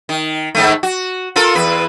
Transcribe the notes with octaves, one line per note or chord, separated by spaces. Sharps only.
D#3
G#2 D#3 A3
F#4
F4 A4 A#4
E2 B4